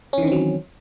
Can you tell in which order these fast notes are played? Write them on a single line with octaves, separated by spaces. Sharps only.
C#4 E3 D#3 C4 F#3